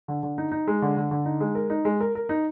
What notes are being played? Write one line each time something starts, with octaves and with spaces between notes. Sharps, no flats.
D3
D3
D#4
D#4
G#3
D3
D3
D3
D#4
G#3
A#4
D#4
G#3
A#4
A#4
D#4